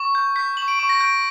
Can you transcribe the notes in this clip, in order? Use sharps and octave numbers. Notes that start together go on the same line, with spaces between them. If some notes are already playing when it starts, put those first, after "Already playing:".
Already playing: C#6
G6
G6 B6
C#6 F#7
D7
C#6
A#6
G6 D7